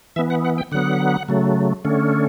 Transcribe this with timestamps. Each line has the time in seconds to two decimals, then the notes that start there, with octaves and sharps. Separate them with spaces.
0.16 E3 B3 E5
0.30 F#5
0.45 F#5
0.58 G5
0.72 D3 F#3 B3 F#5
1.28 C#3 F#3 A3
1.84 D3 A3 C#4